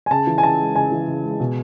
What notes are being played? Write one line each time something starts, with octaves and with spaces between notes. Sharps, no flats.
G#5
C#3 A5
E3
G#5
C#3 A5
G#3
C#3 G#5
E3
C#3
G#3
B2